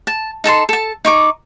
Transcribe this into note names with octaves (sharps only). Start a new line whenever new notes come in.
A5
D#4 A4 A5 C6
A4 A5
D#4 C#6 D6